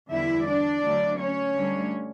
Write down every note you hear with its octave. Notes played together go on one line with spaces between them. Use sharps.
E2 D3 G3 E4 E5
D4 D5
D2 D3 F#3
C#4 C#5
D2 D3 G3 D4